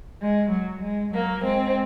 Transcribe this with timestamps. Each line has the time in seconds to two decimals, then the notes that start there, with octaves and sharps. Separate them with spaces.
0.22 G#3
0.52 F#3
0.83 G#3
1.13 F#3 A#3
1.43 G#3 C4